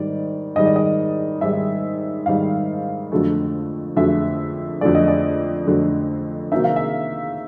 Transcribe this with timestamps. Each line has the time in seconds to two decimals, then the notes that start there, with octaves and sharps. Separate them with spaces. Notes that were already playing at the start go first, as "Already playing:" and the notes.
Already playing: G#2 D#3 G3 D5
0.56 G#2 D#3 G3 D#5
0.66 D5
0.76 D#5
1.41 G#2 D#3 G3 E5
2.26 G#2 D#3 G3 F5
3.12 F2 D3 F#3 A3
3.96 F2 D3 F#3 A3 E5
4.81 F2 D3 F#3 A3 D5
4.95 D#5
5.08 D5
5.66 F2 D3 F#3 A3
6.52 C3 D#3 F#3 A#3 D#4 E5
6.64 F5
6.76 E5